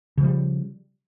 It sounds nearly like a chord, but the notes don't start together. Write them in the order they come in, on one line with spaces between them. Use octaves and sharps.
C#3 F3 G3